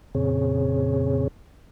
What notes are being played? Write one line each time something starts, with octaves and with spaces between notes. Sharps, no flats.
F2 A#2 C#3 C4 G#4 C#5